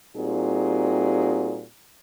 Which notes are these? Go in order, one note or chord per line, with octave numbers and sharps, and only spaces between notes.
A#2 G3 C4 D#4 F#4 G#4